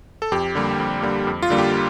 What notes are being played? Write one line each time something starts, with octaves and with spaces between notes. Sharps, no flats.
A4
F2 G4
D3 G3 A#3
F2
D3 G3 A#3
F2
F4
D3 G3 A#3
G4